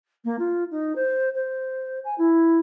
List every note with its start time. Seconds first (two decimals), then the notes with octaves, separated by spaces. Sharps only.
0.25 A#3
0.39 F4
0.71 D#4
0.96 C5
1.35 C5
2.05 G#5
2.18 E4